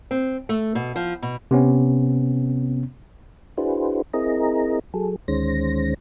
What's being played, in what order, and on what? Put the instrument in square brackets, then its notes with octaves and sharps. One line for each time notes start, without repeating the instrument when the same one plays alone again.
[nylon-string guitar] C4
A3
B2
F3
B2
[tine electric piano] C3 B3 C#4
[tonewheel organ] D4 E4 F#4 G#4 B4 C5
C4 E4 G#4 A#4 D#5 A#5
F#3 G#4 A4
D2 D#3 G#3 C#4 C5 A#6